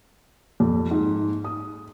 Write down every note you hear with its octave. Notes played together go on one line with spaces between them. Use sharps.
F2
G#2
D#6